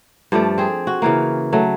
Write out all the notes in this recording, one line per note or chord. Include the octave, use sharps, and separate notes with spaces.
G2 F3 A3 D5
C4 G#4
F#4
C#3 E3 A#3
F#3 A3